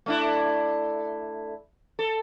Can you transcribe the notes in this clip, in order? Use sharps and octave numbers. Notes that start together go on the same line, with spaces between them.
A3 D4 E4
A4